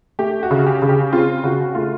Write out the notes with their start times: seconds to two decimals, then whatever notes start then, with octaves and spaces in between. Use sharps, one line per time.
0.19 A3 G4
0.43 F#4
0.51 C#3
0.66 G4
0.82 C#3
0.89 G4
1.13 C4 F4
1.44 C#3 F#4
1.75 A3 F4